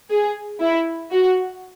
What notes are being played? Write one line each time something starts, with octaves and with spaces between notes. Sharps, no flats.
G#4
E4
F#4